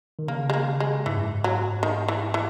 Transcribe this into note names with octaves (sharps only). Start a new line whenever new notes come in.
D#3
C#3 A#3
G#3
A#3
G#3
G#2 E3
F#2
G#2
F#3
D#3
E3
E3